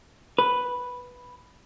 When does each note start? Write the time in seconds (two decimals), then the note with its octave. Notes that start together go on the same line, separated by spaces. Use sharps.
0.38 B4